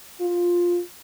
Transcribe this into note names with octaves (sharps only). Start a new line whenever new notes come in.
F4